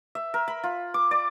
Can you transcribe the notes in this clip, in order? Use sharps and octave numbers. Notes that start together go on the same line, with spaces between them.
E5
A#4
B5
F4
D6
D5